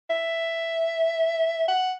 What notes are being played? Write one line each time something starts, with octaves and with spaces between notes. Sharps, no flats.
E5
F#5